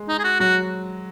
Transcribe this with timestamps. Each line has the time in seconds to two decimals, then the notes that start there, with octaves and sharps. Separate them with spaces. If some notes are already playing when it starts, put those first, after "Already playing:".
Already playing: G#3
0.08 D#4
0.19 G#4
0.24 F#4
0.40 F#3 F#4